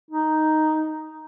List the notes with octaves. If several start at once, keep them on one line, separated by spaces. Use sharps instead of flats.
D#4